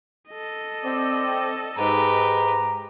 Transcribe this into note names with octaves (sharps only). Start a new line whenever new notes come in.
A4 D#5
C4 D5
G#2 G4 B4 A#5